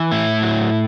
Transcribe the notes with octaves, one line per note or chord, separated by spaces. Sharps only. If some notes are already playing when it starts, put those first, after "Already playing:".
Already playing: E3
A2 E4
F#3